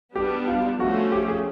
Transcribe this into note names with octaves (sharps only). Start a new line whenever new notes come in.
G3 B3 D4 G4
F4
F3 A3 C#4 F#4
G4
G#4